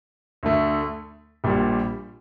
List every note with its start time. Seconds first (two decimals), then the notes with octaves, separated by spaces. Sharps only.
0.43 D2 D3 A3
1.44 A#1 A#2 G3